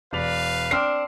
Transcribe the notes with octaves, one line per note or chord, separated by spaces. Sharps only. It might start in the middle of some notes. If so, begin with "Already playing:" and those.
E1 B4 D5 F5 F7
C4 D4 D6 F6 C7